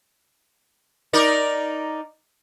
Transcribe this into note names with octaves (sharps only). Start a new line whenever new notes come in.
D#4 A#4 D5